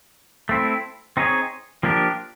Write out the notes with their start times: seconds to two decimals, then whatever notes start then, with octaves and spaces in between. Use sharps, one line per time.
0.49 A3 C4 E4
1.17 C4 D#4 G#4 C#5
1.83 F3 A#3 D4 G4 A#4